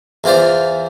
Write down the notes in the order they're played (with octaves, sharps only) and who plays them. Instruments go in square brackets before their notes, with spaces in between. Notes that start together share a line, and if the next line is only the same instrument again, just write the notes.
[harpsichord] E2 E3 F4 C5 D5